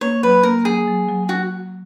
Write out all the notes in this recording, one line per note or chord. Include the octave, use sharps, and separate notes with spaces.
A#3 C#5
F#3 B4
A#3 A#4
F#3 G#4
F#3
F#3
F#3 F#4